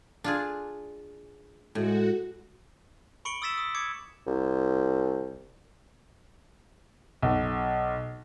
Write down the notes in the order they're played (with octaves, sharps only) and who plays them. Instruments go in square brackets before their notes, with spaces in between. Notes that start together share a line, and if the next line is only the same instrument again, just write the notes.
[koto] D4 F4 G#4
[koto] A2 [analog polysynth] G#3 [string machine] F#4
[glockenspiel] B5 C#6 C#7 D7 F#7 G7
D#6 E6 A6 B6 E7
D#6
D6 G#6 C#7
[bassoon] C2
[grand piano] B1